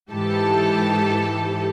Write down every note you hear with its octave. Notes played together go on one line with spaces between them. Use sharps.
G#2 E3 G4 A4 A5